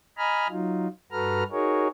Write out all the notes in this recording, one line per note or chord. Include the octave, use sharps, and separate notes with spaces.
D#5 G#5 A#5 B5 F6
F#3 D#4 F4
G2 F#4 A4 B4 A#5 F6
D#4 F#4 G#4 A#4 C#5